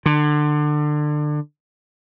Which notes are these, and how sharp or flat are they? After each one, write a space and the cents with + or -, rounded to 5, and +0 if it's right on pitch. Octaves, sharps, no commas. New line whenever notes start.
D3 +25